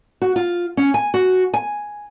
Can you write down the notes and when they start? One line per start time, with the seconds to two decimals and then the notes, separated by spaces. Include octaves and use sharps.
0.22 F#4
0.36 F4
0.77 C#4
0.94 G#5
1.14 F#4
1.54 G#5